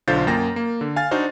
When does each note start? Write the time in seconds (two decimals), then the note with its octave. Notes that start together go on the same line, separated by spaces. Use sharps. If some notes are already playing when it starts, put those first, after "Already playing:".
0.08 B1 D3 F4 C5 G6 A6
0.27 F#2 A#3 G5 A#6
0.56 A#3
0.81 D3
0.96 F5 G#5 F6 A6
1.11 D4 D#4 F#4 C5